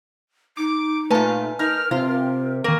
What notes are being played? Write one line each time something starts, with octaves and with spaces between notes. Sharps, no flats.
D#4 D6
A#2 A3 F4 B4 G#5 A5
D#4 A#4 F6
C3 F4
D#3 A#3 A#4